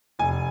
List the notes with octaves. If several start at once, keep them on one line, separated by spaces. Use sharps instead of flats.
F1 G#5